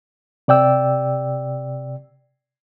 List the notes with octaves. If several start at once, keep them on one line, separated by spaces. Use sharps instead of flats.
C3 D5 G5 E6